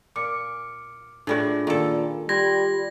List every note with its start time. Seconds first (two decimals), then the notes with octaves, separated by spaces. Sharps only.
0.16 A#2 D6 F6 C#7
1.27 A2 G3 D4 F4 F#4 G#4
1.67 A#2 D#3 A4
2.29 G3 F4 C6 G#6 A#6